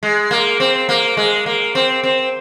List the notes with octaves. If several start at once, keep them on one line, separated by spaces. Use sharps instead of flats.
G#3
A#3
C4
A#3
G#3
A#3
C4
C4